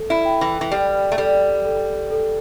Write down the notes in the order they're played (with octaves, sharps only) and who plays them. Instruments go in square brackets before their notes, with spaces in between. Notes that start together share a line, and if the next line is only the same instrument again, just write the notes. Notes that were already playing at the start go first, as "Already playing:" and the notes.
Already playing: [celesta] A4
[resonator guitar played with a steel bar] E4
[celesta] G5
[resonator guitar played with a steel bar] E3
E3
[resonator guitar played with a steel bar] G3 [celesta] G5
[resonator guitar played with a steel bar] A3
[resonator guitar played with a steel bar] G3 [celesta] A4
[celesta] A4
A4